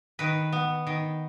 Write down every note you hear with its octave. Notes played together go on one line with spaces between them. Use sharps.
D#3 B4
B3
D#3